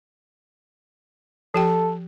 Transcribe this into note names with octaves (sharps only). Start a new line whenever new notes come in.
F3 G4 A4 G5